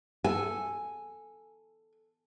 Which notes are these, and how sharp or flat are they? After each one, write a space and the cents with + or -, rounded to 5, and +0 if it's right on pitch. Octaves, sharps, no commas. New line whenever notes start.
A4 +0 G#5 +0